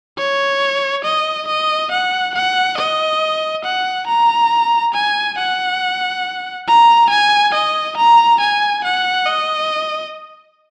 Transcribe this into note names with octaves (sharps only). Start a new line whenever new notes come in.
C#5
D#5
D#5
F#5
F#5
D#5
F#5
A#5
G#5
F#5
A#5
G#5
D#5
A#5
G#5
F#5
D#5